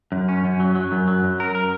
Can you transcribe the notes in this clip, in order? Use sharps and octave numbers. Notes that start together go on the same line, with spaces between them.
F#2
C#4
F#2
F#3
F#3
F#2
F#3
F#2
A#4
A#4